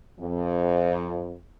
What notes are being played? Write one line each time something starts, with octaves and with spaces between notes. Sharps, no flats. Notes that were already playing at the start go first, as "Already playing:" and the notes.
F2